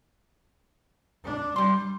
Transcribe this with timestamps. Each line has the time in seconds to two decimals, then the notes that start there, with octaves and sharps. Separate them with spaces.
1.24 D4
1.56 G3 G4 C6